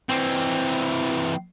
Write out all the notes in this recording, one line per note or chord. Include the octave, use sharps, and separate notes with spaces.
E3 C4